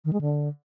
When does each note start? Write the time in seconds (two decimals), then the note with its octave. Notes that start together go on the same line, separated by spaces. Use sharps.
0.05 D#3
0.13 G#3
0.21 D3